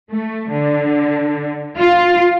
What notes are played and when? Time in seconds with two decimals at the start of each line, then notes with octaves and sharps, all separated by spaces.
0.10 A3
0.51 D3
1.77 F4